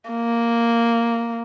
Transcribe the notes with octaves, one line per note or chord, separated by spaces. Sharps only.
A#3